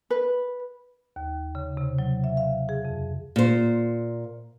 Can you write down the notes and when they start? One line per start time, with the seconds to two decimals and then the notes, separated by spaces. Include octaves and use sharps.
0.10 B4
1.16 D#2
1.55 C#3
1.77 C3
1.99 F#3
2.24 E5
2.37 F5
2.69 G#4
2.85 F2
3.36 A#2 C5